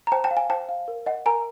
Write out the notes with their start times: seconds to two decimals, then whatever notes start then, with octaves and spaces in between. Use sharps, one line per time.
0.07 A#5
0.12 C5 G5 A5
0.24 G5 A5
0.31 F5
0.37 G#5
0.50 C5 G5 A5
0.69 F5
0.88 A#4
1.06 D#5 F#5
1.26 A#4 G#5 A#5